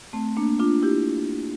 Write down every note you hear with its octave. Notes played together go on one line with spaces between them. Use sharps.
A3 C4
A#3 D4
D4 F4
E4 G4